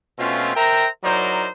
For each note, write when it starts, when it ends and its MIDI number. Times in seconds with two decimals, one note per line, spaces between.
0.18 0.52 47
0.18 0.52 57
0.18 0.52 60
0.18 0.52 61
0.18 0.52 65
0.55 0.87 70
0.55 0.87 72
0.55 0.87 76
0.55 0.87 79
0.55 0.87 82
1.03 1.48 54
1.03 1.48 63
1.03 1.48 64
1.03 1.48 70
1.03 1.48 72
1.03 1.48 74